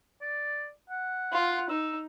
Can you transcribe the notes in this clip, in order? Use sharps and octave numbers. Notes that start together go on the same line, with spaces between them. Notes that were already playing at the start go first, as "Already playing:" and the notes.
D5
F#5
F4
D#4 E6